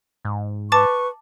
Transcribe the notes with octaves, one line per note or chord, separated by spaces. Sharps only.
G#2
B4 A5 C#6 D6 A6